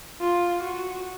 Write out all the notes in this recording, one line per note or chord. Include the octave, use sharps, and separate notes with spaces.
F4
F#4